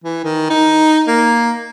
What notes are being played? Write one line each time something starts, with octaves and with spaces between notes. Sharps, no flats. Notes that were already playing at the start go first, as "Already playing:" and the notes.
E3
D#3
D#4
A#3